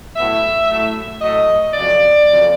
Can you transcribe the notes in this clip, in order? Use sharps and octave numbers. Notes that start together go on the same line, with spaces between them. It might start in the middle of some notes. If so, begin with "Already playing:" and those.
A2 F#3 B3 E5
A2 F#3 A3
A2 F#3 A3 D#5
F2 C#3 F#3 D5
F2 C#3 F#3